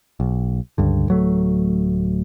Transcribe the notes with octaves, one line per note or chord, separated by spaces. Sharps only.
B1
C#2 G2 D3
D1 F#3 A3